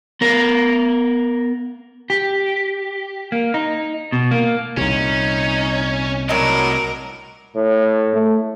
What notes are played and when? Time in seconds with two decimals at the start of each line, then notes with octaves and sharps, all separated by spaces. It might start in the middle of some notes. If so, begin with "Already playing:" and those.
0.21 B3 A#4
2.10 G4
3.32 A#3
3.54 D#4
4.12 B2
4.31 A#3
4.77 C2 A#2 C#4 D#4
6.29 A2 F#3 D4 D#4 A#4
7.56 A2
8.14 A3